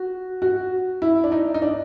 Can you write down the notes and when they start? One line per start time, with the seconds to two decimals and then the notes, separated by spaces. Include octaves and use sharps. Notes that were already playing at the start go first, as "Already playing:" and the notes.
Already playing: F#4
0.42 F#4
1.02 E4
1.24 D4
1.32 D#4
1.54 D#4
1.62 D4